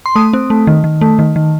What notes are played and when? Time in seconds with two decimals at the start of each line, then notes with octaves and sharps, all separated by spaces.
0.06 C6
0.16 A3 D#6
0.33 C4
0.50 A3
0.67 D#3
0.84 D#3
1.01 A3
1.19 D#3
1.36 D#3